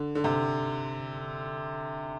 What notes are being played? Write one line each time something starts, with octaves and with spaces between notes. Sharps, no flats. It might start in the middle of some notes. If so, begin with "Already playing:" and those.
Already playing: D3
D3
C3